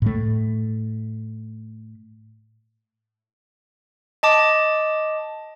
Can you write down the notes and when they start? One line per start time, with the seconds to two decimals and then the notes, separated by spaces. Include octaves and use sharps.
0.02 A2 A3
4.23 D#5 A5 D6